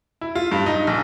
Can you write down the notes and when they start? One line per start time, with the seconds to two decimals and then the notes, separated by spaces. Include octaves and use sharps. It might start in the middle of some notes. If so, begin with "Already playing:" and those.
0.21 E4
0.35 F4
0.51 G2
0.66 D#4
0.87 A#1